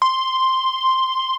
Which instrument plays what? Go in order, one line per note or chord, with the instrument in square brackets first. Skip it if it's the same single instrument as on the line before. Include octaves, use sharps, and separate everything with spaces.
[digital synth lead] C6